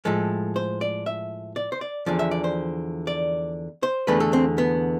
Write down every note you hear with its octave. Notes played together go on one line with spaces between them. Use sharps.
A2 F3 G#3 A4
C5
D5
E5
D5
C5
D5
E2 D3 F3 D5
E5
D5
C5
D5
C5
E2 D3 A3 B4
A4
C4
B3